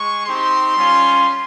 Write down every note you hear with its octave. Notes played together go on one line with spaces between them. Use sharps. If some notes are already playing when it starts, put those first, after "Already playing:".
Already playing: G#3 C#6
C4 D#4 G4 C6
G3 C#4 F4